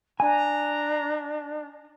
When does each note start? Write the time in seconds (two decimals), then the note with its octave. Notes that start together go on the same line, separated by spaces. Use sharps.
0.20 D4 G#5 A#5